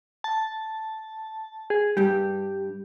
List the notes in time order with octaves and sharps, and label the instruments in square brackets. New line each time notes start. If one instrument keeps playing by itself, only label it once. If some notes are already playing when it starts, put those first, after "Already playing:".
[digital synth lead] A5
G#4
[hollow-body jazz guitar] G2 G3 [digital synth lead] G4